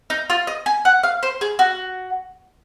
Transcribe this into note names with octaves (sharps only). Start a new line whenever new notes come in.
D#4
F4
D#5
G#5
F#5
F5
C5
G#4
F#4